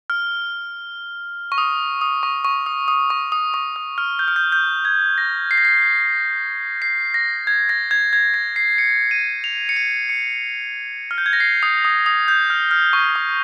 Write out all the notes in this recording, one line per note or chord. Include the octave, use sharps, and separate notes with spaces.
F6
C#6
D#6
D#6
C#6
C#6
D#6
D#6
C#6
D#6
C#6
D#6
F6
G6
F6
G6
G6
G#6
A#6
C7
A#6
C7
C7
A#6
G#6
A#6
G#6
G#6
A#6
C7
C#7
D#7
F7
C#7
D#7
C#7
F6
G6
G#6
A#6
C7
D#6
D#6
D#6
G6
F6
F6
C#6
D#6